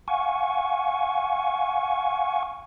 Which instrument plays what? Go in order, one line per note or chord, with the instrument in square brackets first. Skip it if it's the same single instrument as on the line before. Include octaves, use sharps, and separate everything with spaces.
[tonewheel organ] F5 F#5 G#5 C#6